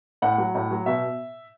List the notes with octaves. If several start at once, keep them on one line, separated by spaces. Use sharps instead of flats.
A2 F#5
F#3
A2
F#3
B2 E5